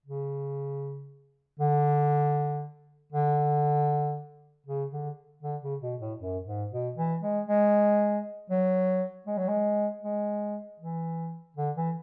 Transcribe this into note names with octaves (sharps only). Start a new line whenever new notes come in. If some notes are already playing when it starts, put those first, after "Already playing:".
C#3
D3
D3
C#3
D3
D3
C#3
B2
A2
F#2
G#2
B2
E3
G#3
G#3
F#3
G#3
F#3
G#3
G#3
E3
D3
E3